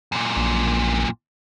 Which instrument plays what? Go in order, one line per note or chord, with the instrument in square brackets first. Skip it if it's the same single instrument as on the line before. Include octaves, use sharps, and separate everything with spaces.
[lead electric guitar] F#2 A#2
[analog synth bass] A#1